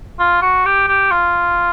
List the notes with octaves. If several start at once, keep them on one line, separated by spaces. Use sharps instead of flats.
F4
F#4
G4
G4
F4